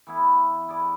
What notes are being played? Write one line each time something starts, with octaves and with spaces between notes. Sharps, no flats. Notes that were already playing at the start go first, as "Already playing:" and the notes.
E3 B3 E4
E4 G#4 D5